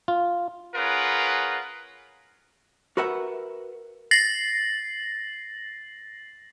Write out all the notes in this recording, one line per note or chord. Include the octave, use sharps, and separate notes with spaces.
F4
C#4 F4 G#4 A#4 B4 F#5
F#4 A#4 B4 E5 F#5
A6 A#6 C7 F#7